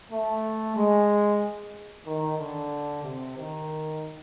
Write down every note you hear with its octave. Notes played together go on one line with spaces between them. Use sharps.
A3
G#3
D#3
D3
C3
D#3